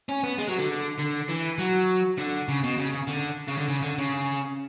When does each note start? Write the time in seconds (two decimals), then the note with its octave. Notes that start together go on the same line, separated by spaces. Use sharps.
0.09 C#4
0.24 B3
0.38 G#3
0.48 F#3
0.59 D3
0.98 D3
1.28 E3
1.58 F#3
2.18 D3
2.48 C#3
2.64 B2
2.78 C#3
3.08 D3
3.48 C#3
3.58 D3
3.68 C#3
3.83 D3
3.98 C#3